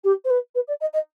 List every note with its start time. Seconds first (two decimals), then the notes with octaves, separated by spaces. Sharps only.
0.04 G4
0.24 C5
0.30 B4
0.55 B4
0.68 D5
0.80 D#5
0.93 D#5